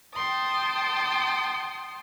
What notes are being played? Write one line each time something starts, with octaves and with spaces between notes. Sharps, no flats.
G5 A5 C6 D#6